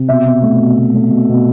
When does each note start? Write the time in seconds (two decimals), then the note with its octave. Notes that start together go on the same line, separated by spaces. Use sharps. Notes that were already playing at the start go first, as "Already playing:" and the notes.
Already playing: C3
0.09 B2 E5
0.25 B2
0.42 A3
0.60 B2
0.77 B2
0.94 A3
1.11 B2
1.29 B2